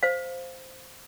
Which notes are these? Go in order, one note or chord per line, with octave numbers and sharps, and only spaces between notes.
C5 F5